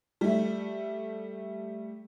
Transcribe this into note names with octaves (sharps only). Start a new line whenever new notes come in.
G3 A3